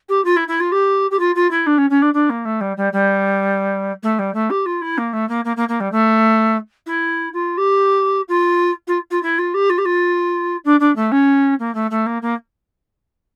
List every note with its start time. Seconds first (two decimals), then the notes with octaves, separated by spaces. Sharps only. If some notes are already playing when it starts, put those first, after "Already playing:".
0.09 G4
0.25 F4
0.36 E4
0.48 E4
0.60 F4
0.72 G4
1.11 G4
1.19 F4
1.35 F4
1.51 E4
1.66 D4
1.78 C#4
1.90 C#4
2.02 D4
2.14 D4
2.30 A#3
2.45 A3
2.61 G3
2.77 G3
2.93 G3
4.03 A3
4.19 G3
4.34 A3
4.50 G4
4.66 F4
4.81 E4
4.98 A#3
5.13 A3
5.29 A#3
5.45 A#3
5.56 A#3
5.68 A#3
5.80 G3
5.92 A3
6.86 E4
7.33 F4
7.57 G4
8.28 F4
8.87 F4
9.11 F4
9.23 E4
9.38 F4
9.54 G4
9.70 F4
9.78 G4
9.85 F4
10.65 D4
10.80 D4
10.96 A3
11.12 C#4
11.59 A#3
11.74 A3
11.91 A3
12.06 A#3
12.22 A#3